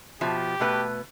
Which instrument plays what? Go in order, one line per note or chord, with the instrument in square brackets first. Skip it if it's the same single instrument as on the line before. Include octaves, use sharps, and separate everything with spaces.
[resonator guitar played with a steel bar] B2 F3 E5 [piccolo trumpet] G4
[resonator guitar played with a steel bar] B2 A3 B4